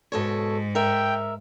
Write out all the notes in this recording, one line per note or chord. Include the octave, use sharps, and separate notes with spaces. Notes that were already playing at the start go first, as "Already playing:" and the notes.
G#2 B2 A4 C#5
A#4 E5 G5